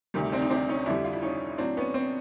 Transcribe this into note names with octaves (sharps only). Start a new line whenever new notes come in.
D2 C3 D#3 G3
C4 D4
D#4
C4 D4
C#4 D#4
F2 D3 G3 D4 E4
F4
E4
C#4 D#4
A2 F#3 C4 D4
B3 C#4
C4